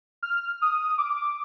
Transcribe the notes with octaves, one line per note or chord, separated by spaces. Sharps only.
F6
D#6
D6